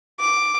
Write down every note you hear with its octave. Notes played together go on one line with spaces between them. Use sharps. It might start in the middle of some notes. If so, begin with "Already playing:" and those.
D6